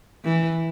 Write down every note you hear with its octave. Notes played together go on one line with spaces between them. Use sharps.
E3